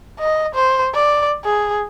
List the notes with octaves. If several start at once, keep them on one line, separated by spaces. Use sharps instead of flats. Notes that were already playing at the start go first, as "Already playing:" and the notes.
D#5
C5
D5
G#4